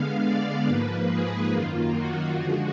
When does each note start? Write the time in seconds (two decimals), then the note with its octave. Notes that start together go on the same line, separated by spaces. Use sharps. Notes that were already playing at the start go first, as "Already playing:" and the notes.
Already playing: D3 G#3 B3 F5
0.23 D5
0.67 G#2 F3 A#3 B4
1.09 G#4
1.54 F#2 D#3 A#3 F4
1.96 F#4
2.40 D3 F3 G#3 F#4